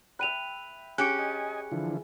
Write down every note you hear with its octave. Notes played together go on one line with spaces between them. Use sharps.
E5 G5 B5 F#6 D#7 F7
C#4 G4 G#4 F#6 C#7
D#5 G#5
D3 E3 F3